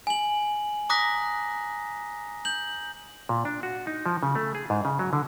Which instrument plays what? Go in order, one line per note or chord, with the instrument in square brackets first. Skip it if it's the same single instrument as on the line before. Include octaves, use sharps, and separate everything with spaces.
[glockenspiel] G#5 F#7
A#5 D6 D#6 F#6 A#6 B6
G6 F#7
[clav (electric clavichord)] A#2
D4
F#4
D#4
F3
C#3
A3
G#4
G#2
C#3
F#3
D3